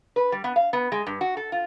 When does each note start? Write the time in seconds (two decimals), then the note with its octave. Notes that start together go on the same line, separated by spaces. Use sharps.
0.16 B4
0.32 G3
0.44 B3
0.56 F5
0.73 B3
0.92 G#3
1.07 G2
1.21 F#4
1.37 A4
1.52 F4